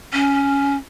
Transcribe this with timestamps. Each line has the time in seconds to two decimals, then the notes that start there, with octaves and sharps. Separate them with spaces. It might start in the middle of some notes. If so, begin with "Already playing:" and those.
0.13 C#4